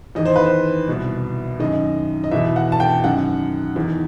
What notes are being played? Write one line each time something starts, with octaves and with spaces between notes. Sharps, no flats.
E2 D#3 D#5
C5
B4
C5
C2 B2
F#2 D#3 D#5
D#5
E2 B2 E5
F#5
A5
G5
F#2 D#3 F#5
E2 D#3